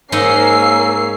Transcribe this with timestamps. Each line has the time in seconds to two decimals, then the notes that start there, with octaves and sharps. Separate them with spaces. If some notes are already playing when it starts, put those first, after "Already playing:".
0.12 G#2 A#3 C#4 D#4 D#5 E6 C7